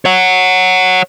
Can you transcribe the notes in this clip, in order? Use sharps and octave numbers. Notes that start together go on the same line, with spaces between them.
C#5 F#5